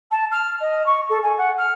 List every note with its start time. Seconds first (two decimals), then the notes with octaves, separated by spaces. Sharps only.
0.11 A5
0.31 F6
0.60 D#5
0.86 C#6
1.09 A4
1.23 G#5
1.37 F#5
1.57 F6